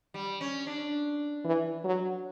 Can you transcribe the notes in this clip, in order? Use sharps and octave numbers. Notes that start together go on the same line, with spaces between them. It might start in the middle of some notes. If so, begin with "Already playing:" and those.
G3
C#4
D4
E3
F#3